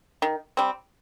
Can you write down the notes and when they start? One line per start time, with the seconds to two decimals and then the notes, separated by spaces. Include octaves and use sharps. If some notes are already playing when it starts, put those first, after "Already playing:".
0.22 D#3
0.57 G3 C4